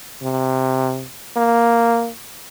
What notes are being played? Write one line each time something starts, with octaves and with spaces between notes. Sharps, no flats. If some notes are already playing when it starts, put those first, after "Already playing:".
C3
A#3